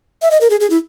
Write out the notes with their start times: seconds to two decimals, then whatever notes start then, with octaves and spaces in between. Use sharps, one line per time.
0.22 E5
0.31 D#5
0.41 A#4
0.50 G#4
0.60 G#4
0.70 E4